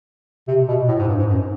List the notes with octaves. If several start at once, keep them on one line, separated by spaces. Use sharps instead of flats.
C3
B2
A2
G#2
G2
G#2
F#2